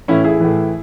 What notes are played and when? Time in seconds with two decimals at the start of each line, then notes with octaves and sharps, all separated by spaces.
0.08 A2 E3 C#4 E4
0.24 E4 G#4
0.40 A2 E3